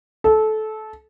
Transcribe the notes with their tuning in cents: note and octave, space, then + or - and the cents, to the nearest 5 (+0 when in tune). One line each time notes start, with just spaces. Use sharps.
A4 -20